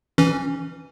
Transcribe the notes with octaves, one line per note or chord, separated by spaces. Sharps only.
E3 C#4